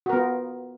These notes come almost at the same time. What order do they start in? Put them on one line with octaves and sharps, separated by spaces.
F#4 A#4 B3 F4